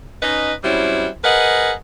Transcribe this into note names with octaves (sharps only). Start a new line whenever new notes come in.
C#4 D#4 B4 D#5
F#3 G3 C4 C#4 E4
G#4 A#4 B4 D#5 F#5